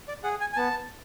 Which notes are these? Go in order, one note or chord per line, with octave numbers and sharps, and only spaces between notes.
D5
G#4 F#5
G#5
G#5
B3 A5